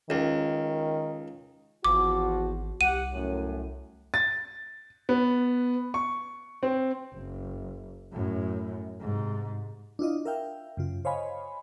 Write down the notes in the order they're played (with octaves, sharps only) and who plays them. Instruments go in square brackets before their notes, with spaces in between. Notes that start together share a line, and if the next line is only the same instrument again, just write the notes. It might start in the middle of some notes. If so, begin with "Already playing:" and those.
[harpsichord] C#2 [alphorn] D#3
[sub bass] G#1 [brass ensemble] E2 F3 F#4 [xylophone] D6
[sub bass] C2 [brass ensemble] G4 F#5 [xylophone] D#7
[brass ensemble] F#2 A2
[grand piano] A6
B3
C#6
C4
[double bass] F#1
F#2 A2
G#2 C3
[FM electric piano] D4 E4 F4 D#5
A#4 E5 F5 G5
F#2 C#3 F4
C5 C#5 D#5 F5 G#5 B5